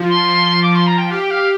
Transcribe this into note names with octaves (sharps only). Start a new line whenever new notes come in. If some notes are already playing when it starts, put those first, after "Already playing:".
Already playing: F3
C6
F3
D6
F3 C6
A#5
G5
G4 F5
G5
F5